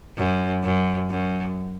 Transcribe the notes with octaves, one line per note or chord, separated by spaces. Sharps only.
F#2
F#2
F#2